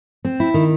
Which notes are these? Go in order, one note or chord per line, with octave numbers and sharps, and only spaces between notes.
C4
E4
D#3